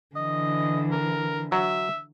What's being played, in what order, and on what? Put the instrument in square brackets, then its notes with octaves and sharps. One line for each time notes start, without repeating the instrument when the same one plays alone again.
[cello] D3 E3 [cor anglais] D#5
[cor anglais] A#4
[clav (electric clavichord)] F#3 [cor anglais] E5